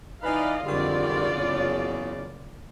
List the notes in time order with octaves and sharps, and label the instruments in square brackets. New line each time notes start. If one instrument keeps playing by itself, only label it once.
[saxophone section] E3 B4 [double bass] D#4 [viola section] D5 D#5 F5
[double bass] F2 D3 [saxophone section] D#3 G3 G#3 [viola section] F4 D5
[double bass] F#1 [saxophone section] E2 C#3